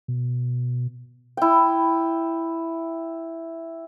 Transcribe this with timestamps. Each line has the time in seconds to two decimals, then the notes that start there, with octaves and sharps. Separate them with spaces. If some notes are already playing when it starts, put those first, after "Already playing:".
0.08 B2
1.37 E4 G5